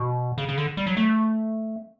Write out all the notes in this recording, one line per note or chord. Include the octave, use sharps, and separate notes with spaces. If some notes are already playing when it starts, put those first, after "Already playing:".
Already playing: B2
C#3
C#3
D3
G3
F#3
A3